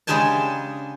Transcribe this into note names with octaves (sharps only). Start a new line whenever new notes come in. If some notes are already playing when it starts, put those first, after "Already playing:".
C#3 G#3 D4 G4 G#5 A5